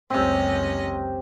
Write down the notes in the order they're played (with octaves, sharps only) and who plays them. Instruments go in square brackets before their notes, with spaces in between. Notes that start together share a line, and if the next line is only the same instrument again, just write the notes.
[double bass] F#1 C#2 [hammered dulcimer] C3 C4 [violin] C#4 D#5